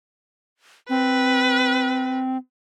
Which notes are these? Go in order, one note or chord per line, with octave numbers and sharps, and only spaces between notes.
C4 B4